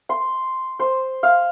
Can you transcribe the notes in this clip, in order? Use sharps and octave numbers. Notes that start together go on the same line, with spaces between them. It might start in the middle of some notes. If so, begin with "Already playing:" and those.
C6
C5
F5